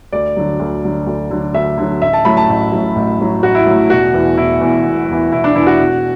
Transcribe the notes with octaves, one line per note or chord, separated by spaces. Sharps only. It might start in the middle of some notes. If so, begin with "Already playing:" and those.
D2 D5
D3 F#3
D2
D3 F#3
D2
D3 F#3
D2 E5
D3 F#3
A1 E5
A5
A2 F#3 B5
A5
A1
A2 F#3
A1
A2 F#3
A1 F#4
E4
A2 F#3
E1 F#4
E2 E3
E1 E4
E2 E3
E1
E2 E3
E1 E4
D4
E2 E3 E4
F#4
E1